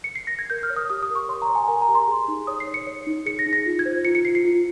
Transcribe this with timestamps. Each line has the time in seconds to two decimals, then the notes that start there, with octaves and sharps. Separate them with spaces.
0.04 C#7
0.15 C7
0.27 A#6
0.39 G#6
0.50 A#4 G6
0.63 F6
0.70 C#5
0.76 D#6
0.90 G4 D#6
1.02 D#6
1.10 A#4
1.15 C#6
1.28 C#5 C6
1.42 A#5
1.49 C#5
1.55 G#5
1.68 A#4 G#5
1.82 A#5
1.88 G4
1.95 C6
2.08 G#4
2.28 D#4
2.47 C#5 D#6
2.60 C7
2.67 C#5
2.74 C#7
2.87 C#5
3.07 D#4
3.26 G#4 C#7
3.39 A#6
3.46 D#4
3.53 A#6
3.66 F4
3.79 G#6
3.85 C5
4.05 F4 C#7
4.15 C#7
4.25 F4 C7
4.35 C7
4.45 F4